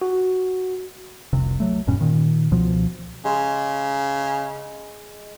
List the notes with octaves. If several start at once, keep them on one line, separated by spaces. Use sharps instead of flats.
F#4
F1 C2 C3
F#3 A3
D#1 G2 B2 C#4
A#2 D#3
C#2 B2 F3
C#3 G#3